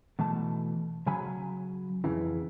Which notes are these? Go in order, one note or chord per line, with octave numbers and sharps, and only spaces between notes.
B2 E3 A3 A5
C#3 F#3 G#5 B5
F2 C#3 E3